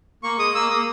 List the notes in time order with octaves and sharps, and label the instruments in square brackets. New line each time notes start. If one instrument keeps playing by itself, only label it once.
[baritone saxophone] A#3 [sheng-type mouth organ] C#6
[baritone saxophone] G#3 [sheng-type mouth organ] D#6
[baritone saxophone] A#3 [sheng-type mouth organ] E6
[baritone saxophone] A#3 [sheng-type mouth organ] D#6